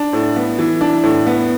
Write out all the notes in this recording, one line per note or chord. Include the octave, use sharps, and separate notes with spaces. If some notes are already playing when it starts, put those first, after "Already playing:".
Already playing: D4
A2
B3
E3
D4
A2
B3